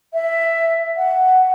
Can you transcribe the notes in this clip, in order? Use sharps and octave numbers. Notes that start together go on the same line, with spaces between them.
E5
F#5